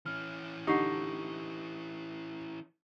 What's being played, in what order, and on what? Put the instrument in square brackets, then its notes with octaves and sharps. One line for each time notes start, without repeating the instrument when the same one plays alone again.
[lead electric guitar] E3 C#4 [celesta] F6
[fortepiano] D3 D#4 [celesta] G4 C#6 C7